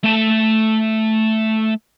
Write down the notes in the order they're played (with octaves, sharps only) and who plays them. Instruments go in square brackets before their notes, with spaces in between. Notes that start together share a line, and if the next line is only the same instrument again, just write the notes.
[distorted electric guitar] A3 A5